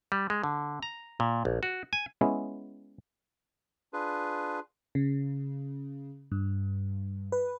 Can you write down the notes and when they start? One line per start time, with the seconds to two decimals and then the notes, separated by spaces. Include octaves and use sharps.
0.12 G3
0.30 G#3
0.44 D3
0.83 A#5
1.20 A#2
1.45 A#1
1.63 F#4
1.93 G#5
2.21 G#3 B3 C#4 E4
3.93 D4 F4 G#4 B4
4.95 C#3
6.32 G2
7.32 B4